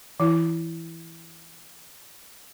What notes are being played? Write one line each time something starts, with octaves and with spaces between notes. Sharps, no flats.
E3 E4